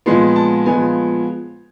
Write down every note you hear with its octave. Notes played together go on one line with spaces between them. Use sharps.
A#2 F3 G#3 B3 C6
A5
A#2 F3 G#3 B3 G#5